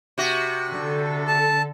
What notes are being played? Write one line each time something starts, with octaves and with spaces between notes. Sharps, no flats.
C3 F#4
D3 A4
A5